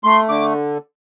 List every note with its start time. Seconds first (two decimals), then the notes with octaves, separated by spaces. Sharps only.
0.04 A3 C6
0.29 D3 D6